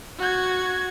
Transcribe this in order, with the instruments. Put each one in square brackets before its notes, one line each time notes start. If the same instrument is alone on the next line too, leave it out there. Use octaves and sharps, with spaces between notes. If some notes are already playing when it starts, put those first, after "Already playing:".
[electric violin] F#4 G#6